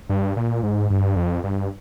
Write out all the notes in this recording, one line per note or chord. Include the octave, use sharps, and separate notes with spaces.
G2
A#2
G#2
G2
F2
G2